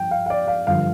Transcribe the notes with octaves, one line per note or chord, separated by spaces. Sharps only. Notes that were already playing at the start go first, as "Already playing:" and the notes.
Already playing: G2 F3 G5
F5
F5
D5
F5
G2 D3 F3 F5